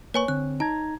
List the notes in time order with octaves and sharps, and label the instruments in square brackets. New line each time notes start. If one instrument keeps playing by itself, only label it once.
[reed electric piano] A#3 B4 [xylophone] C#5 G#5 C#6
[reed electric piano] D3 C4 [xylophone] F#6
[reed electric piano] D#4 A#5 G#6 [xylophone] A5